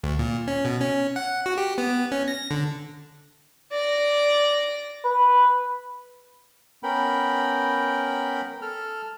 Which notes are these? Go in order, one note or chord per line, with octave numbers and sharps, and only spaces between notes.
D2
A#2
C#4
B2
C#4
F#5
F#4
G4
B3
C#4
A#6
D3
D5 A#6
B4
B3 C#4 A#4 G5 B5
A4 F6